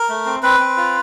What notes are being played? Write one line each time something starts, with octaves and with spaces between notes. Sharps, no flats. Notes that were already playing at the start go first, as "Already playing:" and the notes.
Already playing: A#4
A3
C4
C4 B4
C4
F4